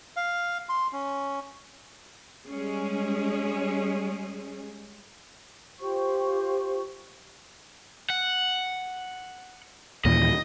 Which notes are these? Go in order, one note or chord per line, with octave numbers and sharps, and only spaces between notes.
F5
C6
C#4
G3 G#3 C#4 G#4
F4 G4 C5 C#6
F#5
D#2 A#2 E3 D#5